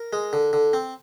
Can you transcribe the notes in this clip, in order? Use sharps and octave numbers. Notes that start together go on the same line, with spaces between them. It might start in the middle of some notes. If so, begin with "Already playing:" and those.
Already playing: A#4
G#3
D3
D3
C4